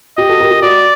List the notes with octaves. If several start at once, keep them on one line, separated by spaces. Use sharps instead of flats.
G4 D#5
F#4 A4
G4 A#4
G4
F#4 D5